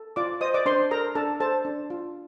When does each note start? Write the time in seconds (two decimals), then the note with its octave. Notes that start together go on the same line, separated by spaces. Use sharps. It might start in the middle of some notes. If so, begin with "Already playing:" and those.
Already playing: A4
0.16 F4 D5 D6
0.41 C5 D#5 D#6
0.54 D5 D6
0.66 D4 C5 C6
0.91 A4 A#4 A#5
1.15 D4 A4 A5
1.40 A4 C5 A5
1.65 D4
1.90 F4